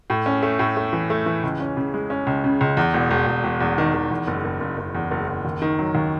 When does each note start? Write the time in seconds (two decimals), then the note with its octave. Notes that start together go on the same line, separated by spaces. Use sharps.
0.10 A2
0.26 C#4
0.42 A3
0.59 A2
0.76 A3
0.93 E3
1.10 A3
1.26 E3
1.43 C#2
1.60 C#4
1.77 C#3
1.94 G#3
2.10 C#4
2.27 C#2
2.44 C#3
2.61 C#2
2.77 E2
2.94 E1
3.11 E1
3.27 E1
3.44 E1
3.60 E2
3.78 D#3
3.94 D#3
4.11 E2
4.27 F#1
4.45 F#1
4.60 F#1
4.78 F#1
4.95 E2
5.11 F#1
5.28 F#1
5.45 D#2
5.62 D#3
5.79 F#3
5.95 D#2